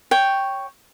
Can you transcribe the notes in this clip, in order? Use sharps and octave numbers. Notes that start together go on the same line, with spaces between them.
C#5 G5